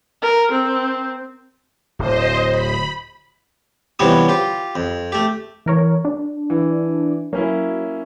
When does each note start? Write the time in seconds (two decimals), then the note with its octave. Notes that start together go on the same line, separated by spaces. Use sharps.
0.22 A#4
0.52 C4
1.99 D1 C5 D#5
2.50 B5
3.99 C3 E3 F3 G3 B3 C#4
4.29 F4 G4
4.75 F2
5.12 A3 G4
5.66 E3 A#4 C#5
6.05 D4
6.50 E3
7.33 F#3 A#3 C#4 E4